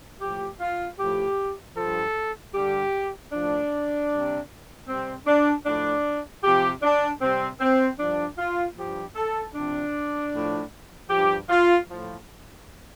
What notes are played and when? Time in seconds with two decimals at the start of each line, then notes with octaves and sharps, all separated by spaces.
0.21 A2 F3 G4
0.60 F4
0.99 A2 F3 G4
1.76 G2 F3 A4
2.54 G2 D3 G3 G4
3.33 A2 F3 D4
4.10 C3 G3
4.88 C3 G3 C4
5.26 D4
5.66 A2 F3 D4
6.44 C3 F3 G4
6.83 D4
7.22 C3 G3 C4
7.61 C4
7.99 G2 F3 D4
8.38 F4
8.77 G2 F3 G4
9.16 A4
9.54 C3 F3 D4
10.32 A2 F3
11.10 G2 F3 G4
11.50 F4
11.89 A2 F3